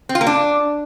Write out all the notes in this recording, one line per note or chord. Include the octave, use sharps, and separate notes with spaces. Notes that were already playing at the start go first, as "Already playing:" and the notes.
C4
F4
A#3
D4